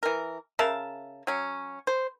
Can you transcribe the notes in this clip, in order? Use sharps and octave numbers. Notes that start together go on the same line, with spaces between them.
E3 A#4
C#3 A#4 E5 A5
F#3 C#4
C5